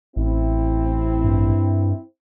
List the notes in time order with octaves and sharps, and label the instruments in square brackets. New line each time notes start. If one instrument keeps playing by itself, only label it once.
[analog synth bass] A1 [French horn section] C4 E4
[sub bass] G2